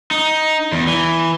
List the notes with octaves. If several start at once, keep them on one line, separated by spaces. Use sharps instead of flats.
D#4
E2
E3